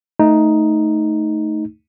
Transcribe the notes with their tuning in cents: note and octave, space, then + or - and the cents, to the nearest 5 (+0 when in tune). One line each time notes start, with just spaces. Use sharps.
A3 +0 D#4 +5